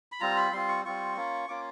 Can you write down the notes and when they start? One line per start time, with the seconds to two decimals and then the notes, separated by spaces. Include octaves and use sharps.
0.12 B5
0.20 G3 C4 F4 A#5
0.37 B5
0.52 G3 C4 F4 C6
0.68 C#6
0.85 G3 C4 F4 C#6
1.16 A#3 C#4 F4
1.48 A#3 C#4 F4 D6